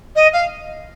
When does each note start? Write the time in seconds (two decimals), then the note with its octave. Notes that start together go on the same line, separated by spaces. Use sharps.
0.15 D#5
0.32 F5